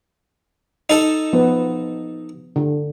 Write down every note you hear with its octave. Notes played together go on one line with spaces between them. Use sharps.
D#4 A4
F3 B3
D3